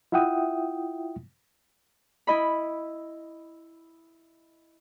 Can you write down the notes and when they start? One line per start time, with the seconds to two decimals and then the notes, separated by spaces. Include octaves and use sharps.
0.12 E4 F4 E5 F#5 G5 D#6
2.27 E4 D#5 B5